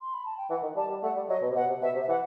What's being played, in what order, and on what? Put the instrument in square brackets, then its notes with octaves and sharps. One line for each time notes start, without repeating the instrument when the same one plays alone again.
[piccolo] C6
B5
A5
G5
[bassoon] E3 [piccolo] F#5
[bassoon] D#3
[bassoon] G3 [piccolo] A5
[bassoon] G3
[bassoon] A3 [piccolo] F#5
[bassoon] G3
[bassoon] F#3 [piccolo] D#5
[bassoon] B2
C3
[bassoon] B2 [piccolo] F#5
[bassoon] C3
[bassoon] B2 [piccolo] E5
[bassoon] C3
[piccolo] E5
[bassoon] E3 [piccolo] F#5